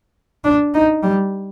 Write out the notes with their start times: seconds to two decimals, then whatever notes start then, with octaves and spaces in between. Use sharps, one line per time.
0.45 D4
0.74 D#4
1.03 G3